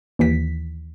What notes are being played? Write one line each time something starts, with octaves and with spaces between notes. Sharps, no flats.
D#2 E3 B6